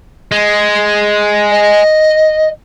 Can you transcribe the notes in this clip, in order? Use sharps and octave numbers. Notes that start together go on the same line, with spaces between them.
G#3
D#5